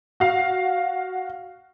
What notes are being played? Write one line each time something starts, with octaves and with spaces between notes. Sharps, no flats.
F#4 F5